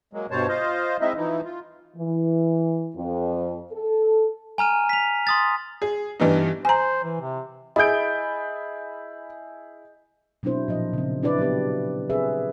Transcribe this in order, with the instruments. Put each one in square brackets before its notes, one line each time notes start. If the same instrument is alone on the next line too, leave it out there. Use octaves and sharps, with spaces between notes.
[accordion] F#3 G#3 A#3
G2 B2 G3 C5 C#5 A5
F4 C5 D#5 F5
G#3 C4 D#4 E4 D#5 E5
E3 F3 D#4 E4
F4
[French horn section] E3
F2
A4
[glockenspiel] G#5 A#5 F6 D#7
B6 F7
C6 D#6 A6
[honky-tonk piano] G#4
G2 E3 G3 B3 D4 D#4
[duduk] C5 [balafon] G#5 A#5
[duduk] E3
C3
[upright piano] E4 G#4 D7 [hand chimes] D#5 [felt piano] B5 D#6 G6
[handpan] B2 F#3 C4 D4 E4 C5
A#2 F3 D#5
C#3 C4
D4 E4 B4 D5
F#3 B3 G4 B4
C4 G#4 B4 E5